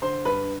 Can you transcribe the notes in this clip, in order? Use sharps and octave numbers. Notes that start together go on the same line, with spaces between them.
D3 C5 C6
G2 B4 B5